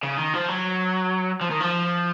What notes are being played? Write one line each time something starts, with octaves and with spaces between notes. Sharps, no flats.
C#3
D#3
F3
F#3
F3
D#3
F3